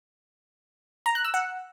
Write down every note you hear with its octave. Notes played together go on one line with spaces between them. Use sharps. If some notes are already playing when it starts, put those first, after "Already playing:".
A#5
F#6
E6
F#5